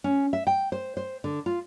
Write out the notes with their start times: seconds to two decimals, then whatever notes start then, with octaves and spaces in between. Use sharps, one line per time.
0.04 C#4
0.33 E5
0.47 G5
0.72 C5
0.97 C5
1.24 D3
1.46 F4